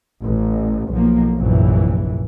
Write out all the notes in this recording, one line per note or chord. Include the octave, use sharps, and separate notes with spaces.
A1
B1 F3 A#3
F1 A#1 F#2 E3